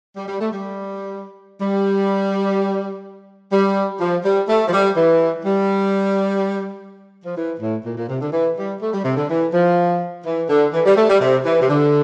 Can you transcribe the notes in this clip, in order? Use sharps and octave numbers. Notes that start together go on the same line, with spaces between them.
G3
G3
A3
G3
G3
G3
F3
G3
A3
F3
G3
E3
G3
F3
E3
A2
A#2
A#2
C3
D3
E3
G3
A3
G3
C3
D3
E3
F3
E3
D3
E3
G3
A3
G3
C3
E3
C3
D3